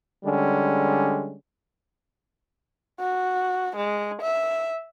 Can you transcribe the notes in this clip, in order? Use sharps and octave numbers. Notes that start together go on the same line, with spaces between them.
D3 G3 G#3 C#4
F#4
G#3
E5